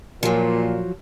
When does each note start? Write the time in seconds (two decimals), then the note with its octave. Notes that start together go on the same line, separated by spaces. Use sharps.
0.23 A#2 F3 F#3